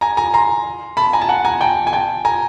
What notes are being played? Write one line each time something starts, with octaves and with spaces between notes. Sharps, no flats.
G#5 A#5
G#5 A#5
A#5 C6
A5 B5
G#5 A#5
A5
F#5 G#5
G#5 A#5
G5 A5
G#5
G5 A5
G#5 A#5